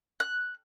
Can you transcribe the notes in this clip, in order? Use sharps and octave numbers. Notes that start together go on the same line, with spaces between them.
F#6